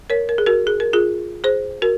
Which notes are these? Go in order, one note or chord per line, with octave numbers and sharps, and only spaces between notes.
A#4 C#5
A#4
G#4
F#4 A#4
G#4
A#4
F4 G#4
G#4 C5
F#4 A#4